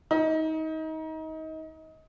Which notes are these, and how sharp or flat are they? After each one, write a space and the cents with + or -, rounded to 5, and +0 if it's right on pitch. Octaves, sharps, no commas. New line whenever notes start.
D#4 +25